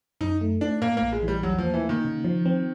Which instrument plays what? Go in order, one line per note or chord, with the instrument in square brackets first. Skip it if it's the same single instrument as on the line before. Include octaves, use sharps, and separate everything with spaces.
[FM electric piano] F#2 [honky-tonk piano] D#4
[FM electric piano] A3
[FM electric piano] A3 [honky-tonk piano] D4
[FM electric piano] A2 [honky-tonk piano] A#3
[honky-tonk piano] A#3
[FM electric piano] A#1
[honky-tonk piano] G#3
[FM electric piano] E3
[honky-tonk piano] G3
[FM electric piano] E2 [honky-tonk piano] F#3
[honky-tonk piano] F3
[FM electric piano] A#3
[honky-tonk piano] E3
[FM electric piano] A#3
[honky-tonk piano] D#3
[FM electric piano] C#3
F3
C4